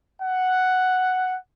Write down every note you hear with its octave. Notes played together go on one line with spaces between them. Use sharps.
F#5